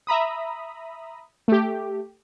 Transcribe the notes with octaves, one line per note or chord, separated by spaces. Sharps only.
E5 A#5 B5 D#6
A3 G4